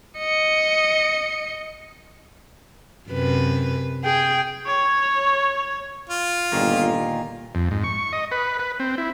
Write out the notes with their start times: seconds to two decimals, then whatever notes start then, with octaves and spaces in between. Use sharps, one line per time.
0.18 D#5 C#7
3.09 F#2 C3 B4
4.04 G#4 G5
4.66 C#5
6.10 F4
6.52 G1 A#2 D#3 A#3
7.55 F2
7.71 G#2
7.84 C#6
8.13 D#5
8.32 B4
8.59 B4
8.80 C4
8.98 E4